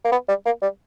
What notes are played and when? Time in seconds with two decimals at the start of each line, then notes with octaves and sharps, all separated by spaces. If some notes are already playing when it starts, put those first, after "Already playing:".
0.04 A#3
0.12 B3
0.28 G3
0.46 A#3
0.62 G3